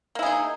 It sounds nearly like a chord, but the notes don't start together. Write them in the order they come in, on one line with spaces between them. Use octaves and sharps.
A#3 E4 G#4 D#4